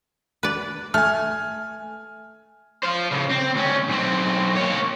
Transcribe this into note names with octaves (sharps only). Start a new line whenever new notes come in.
B4 D5
A3 G#5 F6
C5 F5
A2 C#3
C4
D2 C#4
B1 C4
A#3 C#5